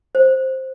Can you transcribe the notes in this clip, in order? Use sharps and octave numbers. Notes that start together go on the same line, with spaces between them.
C5